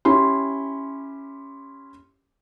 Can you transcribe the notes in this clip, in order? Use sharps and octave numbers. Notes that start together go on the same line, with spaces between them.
C#4 E4 G4 C6